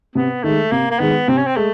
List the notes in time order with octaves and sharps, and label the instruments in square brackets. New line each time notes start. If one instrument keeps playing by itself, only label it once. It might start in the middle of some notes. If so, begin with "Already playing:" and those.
[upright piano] C3 [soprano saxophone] B3
[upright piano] D#3 G#3 [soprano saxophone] A3
[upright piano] C3 [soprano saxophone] A#3
[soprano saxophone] A#3
[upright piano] D#3 G#3 [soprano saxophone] B3
[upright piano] C3 [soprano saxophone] C4
[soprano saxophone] C#4
C4
[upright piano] G#3 [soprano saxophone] A3